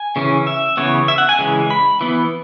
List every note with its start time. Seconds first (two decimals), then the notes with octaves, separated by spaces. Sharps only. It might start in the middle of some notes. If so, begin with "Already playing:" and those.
Already playing: G#5
0.16 C#3 E3 C#4
0.47 E5
0.77 C#3 E3 B3 C#5
1.08 E5
1.18 F#5
1.29 G#5
1.39 C#3 E3 G#3
1.70 B5
2.01 E3 B3